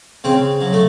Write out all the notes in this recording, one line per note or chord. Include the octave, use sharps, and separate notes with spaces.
C#3 C4
F#3
A3